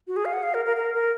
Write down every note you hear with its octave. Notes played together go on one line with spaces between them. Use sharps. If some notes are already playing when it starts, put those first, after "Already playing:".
F#4
G#4
F5
F#5
F5
A#4
A#4
A#4
A#4